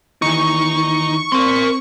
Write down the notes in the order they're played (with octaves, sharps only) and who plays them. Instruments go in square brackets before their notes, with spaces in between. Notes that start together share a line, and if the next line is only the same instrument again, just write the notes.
[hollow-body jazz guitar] D#2 E3 [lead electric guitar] D#4 [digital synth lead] C#6
[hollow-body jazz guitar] C4 [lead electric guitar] A#4 C6